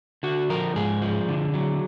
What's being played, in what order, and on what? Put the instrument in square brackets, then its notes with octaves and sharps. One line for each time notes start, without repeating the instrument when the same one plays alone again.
[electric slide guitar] D3 F#4
F3 A#4
G#2 G#4
F3
D3
F#3